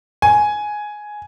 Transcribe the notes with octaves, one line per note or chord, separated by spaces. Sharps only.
G#5